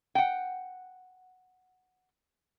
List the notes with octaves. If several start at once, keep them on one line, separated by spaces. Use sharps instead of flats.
F#5 G5